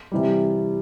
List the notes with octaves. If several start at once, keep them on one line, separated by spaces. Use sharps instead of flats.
C3 E3 G3